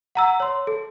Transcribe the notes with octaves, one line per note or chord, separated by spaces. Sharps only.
F#5 A#5 E6
C#5 C6
A4